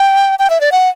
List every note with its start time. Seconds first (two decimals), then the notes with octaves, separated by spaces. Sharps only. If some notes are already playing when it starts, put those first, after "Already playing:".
Already playing: G5
0.39 G5
0.50 E5
0.61 D5
0.72 F#5